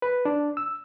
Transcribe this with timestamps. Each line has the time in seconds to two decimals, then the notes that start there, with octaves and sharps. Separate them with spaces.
0.02 B4
0.25 D4
0.57 E6